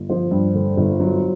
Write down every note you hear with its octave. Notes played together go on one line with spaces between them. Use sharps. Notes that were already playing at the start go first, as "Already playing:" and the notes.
Already playing: G1
F3 C5
G2
D3
G1
F#3